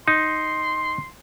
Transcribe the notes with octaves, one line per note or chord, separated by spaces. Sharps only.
D#4 C6